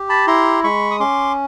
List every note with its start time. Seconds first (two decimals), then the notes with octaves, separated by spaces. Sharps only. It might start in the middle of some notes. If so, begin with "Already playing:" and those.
Already playing: G4
0.09 A5 B5
0.27 E4 A#5 C6
0.64 G#3 B5 C#6
0.91 D#6
1.00 C#4 C6 D6